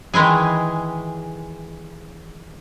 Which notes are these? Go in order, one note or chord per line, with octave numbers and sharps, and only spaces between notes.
D#3 E3 G#3 E4 G#4